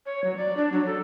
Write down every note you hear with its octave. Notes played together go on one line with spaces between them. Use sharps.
C#5
F#3
D5
D4
F#3
A4